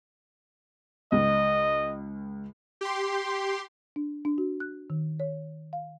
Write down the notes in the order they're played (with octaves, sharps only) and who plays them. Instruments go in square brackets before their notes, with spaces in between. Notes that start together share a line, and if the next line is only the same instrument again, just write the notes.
[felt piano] C#2 [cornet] D#5
[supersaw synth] G4 C6
[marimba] D4
D4
F#4
F#6
D#3
C#5
F5